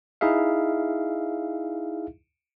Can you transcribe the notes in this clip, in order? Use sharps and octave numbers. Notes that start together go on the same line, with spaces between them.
D#4 E4 G#4 E5 F5